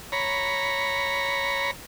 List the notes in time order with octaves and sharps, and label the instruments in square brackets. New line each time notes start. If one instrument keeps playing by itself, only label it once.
[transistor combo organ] C#5 A#5 B5